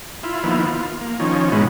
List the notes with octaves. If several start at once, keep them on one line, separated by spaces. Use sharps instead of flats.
E4 F4
D#3 F3 A#3 B3 E4
F4
A#3
D#3 F3 C#4
G#2 B2 D#3 E3 G#3 B3